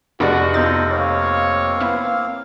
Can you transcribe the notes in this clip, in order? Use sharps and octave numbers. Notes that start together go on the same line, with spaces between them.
F1 D4 F#4 G#4 D5
B3 D#4 F4 A4 C5 A6
A#3 C4 C#5 F5
B3 E4